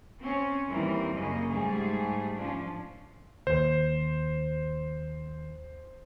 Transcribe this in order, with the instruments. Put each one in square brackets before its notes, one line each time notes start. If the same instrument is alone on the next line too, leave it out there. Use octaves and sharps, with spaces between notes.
[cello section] C4 C#4 C#5
D#2 E3 G3 C4 A#4
F#2 C#3 A#3 D#5
G#2 G3 A3 G#4
F3 C#4 D4
[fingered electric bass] D#2 [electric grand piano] C5